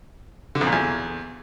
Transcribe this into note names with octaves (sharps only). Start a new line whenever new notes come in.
D3
F2
A#2
E2